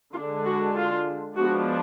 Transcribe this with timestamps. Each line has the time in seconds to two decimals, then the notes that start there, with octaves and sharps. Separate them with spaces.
0.14 D3 G#3 D4 F4
0.45 F#4
0.76 F4
1.37 F3 G#3 B3 D4 F#4